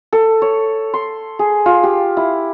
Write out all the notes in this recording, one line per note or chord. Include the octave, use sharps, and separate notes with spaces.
A4
C#5
C6
G#4
F4
G4
E4